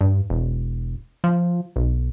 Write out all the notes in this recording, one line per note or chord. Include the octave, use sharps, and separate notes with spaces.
G2
E1
F3
B1